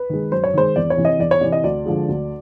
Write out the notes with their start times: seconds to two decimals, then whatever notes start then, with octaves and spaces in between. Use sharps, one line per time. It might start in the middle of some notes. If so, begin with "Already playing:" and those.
Already playing: B4
0.09 D#3 G#3
0.32 F#2 C5
0.44 C#5
0.53 D#3 G#3 C5
0.76 E2 D5
0.90 C#5
0.97 C3 E3
1.05 D#5
1.19 E2 D5
1.31 C#5
1.41 C3 E3 D5
1.52 D#5
1.64 D2 D5
1.86 D3 F3 G#3
2.08 D2